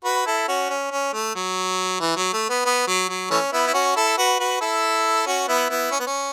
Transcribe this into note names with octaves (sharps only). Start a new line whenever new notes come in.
F#4 B4
E4 A4
C#4 F#4
C#4
C#4
A3
F#3
E3
F#3
A3
B3
B3
F#3
F#3
E3 A3 C#4
B3 E4
E4
C#4 F#4
E4 A4
F#4 B4
F#4 B4
E4 A4
C#4 F#4
B3 E4
B3 E4
C#4
B3
C#4